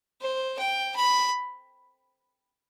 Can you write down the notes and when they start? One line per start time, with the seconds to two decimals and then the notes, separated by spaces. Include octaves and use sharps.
0.21 C5
0.59 G5
0.96 B5